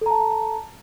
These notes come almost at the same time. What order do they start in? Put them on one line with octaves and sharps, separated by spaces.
A4 A#5 A5